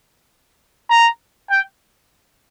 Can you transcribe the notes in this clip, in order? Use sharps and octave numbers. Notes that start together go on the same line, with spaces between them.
A#5
G5